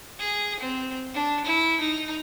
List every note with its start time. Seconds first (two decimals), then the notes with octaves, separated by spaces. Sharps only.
0.19 G#4
0.60 C4
1.14 D4
1.44 E4
1.80 D#4